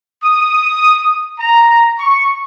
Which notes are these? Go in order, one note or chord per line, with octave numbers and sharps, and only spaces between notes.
D#6
A#5
C#6